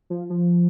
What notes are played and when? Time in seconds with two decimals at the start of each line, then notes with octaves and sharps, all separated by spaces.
0.10 F3
0.30 F3